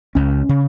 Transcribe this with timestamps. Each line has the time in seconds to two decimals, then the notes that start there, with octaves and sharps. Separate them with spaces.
0.15 C#2 C#3 C#4
0.49 C#3